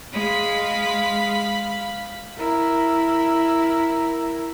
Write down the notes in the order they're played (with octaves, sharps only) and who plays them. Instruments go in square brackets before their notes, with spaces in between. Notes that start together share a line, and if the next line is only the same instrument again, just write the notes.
[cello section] G#3 [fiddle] F5 B5
[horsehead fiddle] E4 A#4